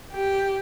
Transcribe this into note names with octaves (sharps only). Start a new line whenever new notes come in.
G4